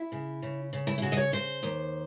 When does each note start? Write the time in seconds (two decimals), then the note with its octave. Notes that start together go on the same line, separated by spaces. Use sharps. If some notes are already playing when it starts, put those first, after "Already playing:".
Already playing: E4
0.12 C#3
0.42 C#3
0.73 C#3
0.87 E4
0.98 E4
1.02 C#3 F#4
1.12 D#5
1.17 C#5
1.32 C#3 C5
1.63 D#2